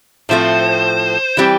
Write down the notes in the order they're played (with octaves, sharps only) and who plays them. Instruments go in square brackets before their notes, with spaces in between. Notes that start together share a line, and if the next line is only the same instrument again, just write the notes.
[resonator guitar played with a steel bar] A2 F3 A3 C4 [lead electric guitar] C5
[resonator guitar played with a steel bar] E3 G3 C4 G4